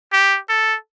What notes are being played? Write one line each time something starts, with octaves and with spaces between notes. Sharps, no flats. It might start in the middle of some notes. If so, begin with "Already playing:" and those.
G4
A4